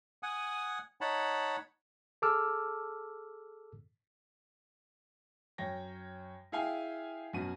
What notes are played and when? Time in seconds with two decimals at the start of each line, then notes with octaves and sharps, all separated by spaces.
0.23 F#5 G#5 D#6
1.01 D#4 C#5 F#5 A5 B5
2.22 G#4 A4 A5 D6 E6 F6
5.58 F#2 C#5 G5 A#6
6.52 E4 G#4 F5 G5 G#5
7.33 F#2 B2 C#4 F#4 D#7